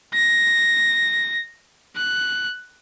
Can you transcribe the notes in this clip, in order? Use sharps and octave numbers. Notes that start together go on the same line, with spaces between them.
A#6
F#6